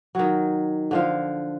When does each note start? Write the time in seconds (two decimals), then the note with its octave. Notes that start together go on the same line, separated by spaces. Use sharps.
0.15 D#3 F#3
0.91 D3 F3 F5